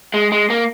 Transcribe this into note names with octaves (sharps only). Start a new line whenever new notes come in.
G#3
G#3
A#3